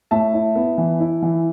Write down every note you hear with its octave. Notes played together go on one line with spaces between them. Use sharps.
A2 E5 A5
E4
B3
E3
E4
E3